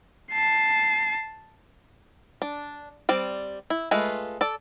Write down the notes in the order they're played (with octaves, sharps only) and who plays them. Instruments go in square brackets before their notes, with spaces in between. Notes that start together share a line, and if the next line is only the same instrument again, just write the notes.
[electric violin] A5 C7
[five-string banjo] D4
G3 C4 D5
E4
G#3 A3 F4 B4
A4 D5